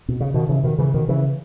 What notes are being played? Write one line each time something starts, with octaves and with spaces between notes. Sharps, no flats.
B2
C#3
B2 D#3
C#3 E3
B2 D#3
C#3 E3
B2 D#3
C#3 E3